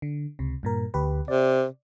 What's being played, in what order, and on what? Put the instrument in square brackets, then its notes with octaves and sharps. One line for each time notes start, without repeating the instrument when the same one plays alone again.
[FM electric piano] D3
C#2 C3
G2 A#2 A#4
D2 G4 B4
[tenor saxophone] C3 [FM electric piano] D5